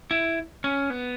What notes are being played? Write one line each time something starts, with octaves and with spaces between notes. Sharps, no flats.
E4
C#4
B3